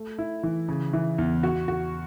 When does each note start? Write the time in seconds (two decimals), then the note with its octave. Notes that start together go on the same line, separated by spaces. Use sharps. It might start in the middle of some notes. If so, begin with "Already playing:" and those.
Already playing: A3
0.18 E4
0.43 E3
0.69 C#3
0.93 E3
1.18 E2
1.43 F#4
1.68 F#4